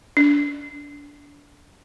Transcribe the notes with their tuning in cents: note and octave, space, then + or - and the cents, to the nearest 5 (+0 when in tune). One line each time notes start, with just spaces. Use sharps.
D4 -30